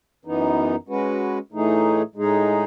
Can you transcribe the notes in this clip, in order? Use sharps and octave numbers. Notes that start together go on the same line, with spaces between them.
F#2 E3 B3 D#4
G#3 C#4 F#4 B4
A2 E3 A3 D#4 G#4
A2 G#3 D#4 G#4